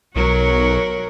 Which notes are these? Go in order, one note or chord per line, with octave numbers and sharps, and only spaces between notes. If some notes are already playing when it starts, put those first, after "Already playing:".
B1 F#3 F#4 A#4 C#5